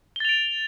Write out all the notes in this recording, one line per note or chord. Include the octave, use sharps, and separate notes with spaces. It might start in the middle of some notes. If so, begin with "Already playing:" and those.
A6 D7 F7 G7